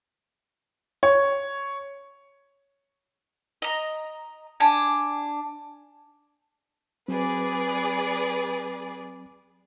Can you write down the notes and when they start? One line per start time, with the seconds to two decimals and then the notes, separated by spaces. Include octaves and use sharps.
1.03 C#5
3.62 D#5 A#5
4.60 D4 G#5
7.08 F#3 C4 G#4 B4 D5